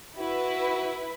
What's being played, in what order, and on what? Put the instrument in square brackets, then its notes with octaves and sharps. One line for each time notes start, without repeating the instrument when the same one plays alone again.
[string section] E4 B4 [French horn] F#4